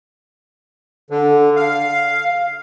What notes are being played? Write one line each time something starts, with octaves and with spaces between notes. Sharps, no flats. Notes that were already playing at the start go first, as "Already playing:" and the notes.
D3
F5